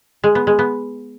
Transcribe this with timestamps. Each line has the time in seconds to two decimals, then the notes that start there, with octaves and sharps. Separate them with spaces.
0.24 G#3
0.35 B3
0.47 G#3
0.59 B3